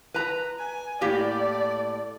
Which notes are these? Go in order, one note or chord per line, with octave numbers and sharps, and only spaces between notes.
B4 A#5
G#5
A2 A#3 G4 D5